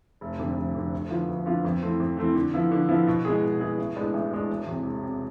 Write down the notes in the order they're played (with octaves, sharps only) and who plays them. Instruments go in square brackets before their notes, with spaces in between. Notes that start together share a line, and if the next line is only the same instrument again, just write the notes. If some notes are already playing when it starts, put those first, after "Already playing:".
[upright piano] F1
F2 D3
F1
F2 D3
D2
D3 F3 B3 F4
D2
D3 F3 B3 F4
F2
E3 A3 C4
F2
E3 A3 C4
D3
F3 B3 E4
D3
F3 B3 E4
B2
G#3 B3 E4 G#4
B2
G#3 B3 E4 G#4
A1
A2 G#3 B3 D4
A1
A2 G#3 B3 D4
E1
E2 C3
E1
C3